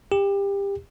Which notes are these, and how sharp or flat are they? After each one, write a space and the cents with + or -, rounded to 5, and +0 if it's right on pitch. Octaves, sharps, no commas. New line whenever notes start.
G4 +25